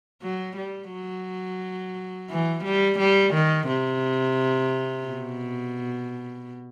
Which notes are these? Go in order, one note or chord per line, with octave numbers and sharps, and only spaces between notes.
F#3
G3
F#3
E3
G3
G3
D#3
C3
B2